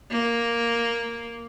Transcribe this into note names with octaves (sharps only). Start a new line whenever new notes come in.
A#3